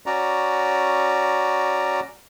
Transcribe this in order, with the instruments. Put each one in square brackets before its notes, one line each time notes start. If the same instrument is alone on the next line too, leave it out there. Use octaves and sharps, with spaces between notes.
[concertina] C#4 F#4 D5 A#5